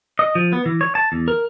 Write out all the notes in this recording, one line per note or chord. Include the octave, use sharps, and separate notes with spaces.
D#5
F3
B3
E3
C#5
A5
E2
A#4